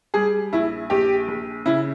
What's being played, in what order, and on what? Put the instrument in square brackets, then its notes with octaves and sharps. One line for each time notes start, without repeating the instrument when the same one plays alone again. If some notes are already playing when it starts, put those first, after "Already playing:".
[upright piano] G3 G#4
A#1 E4
A#1 G4
A#1
C#3 E4